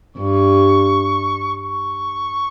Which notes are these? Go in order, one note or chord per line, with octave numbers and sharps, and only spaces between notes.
G2 C#6
C#6